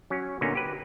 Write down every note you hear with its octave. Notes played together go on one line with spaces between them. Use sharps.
F#3 C#4
A#2 D3 A#3 B3 C#4 D#4
G4 B4